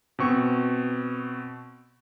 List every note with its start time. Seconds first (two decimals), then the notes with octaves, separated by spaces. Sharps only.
0.19 B2 C4 C#6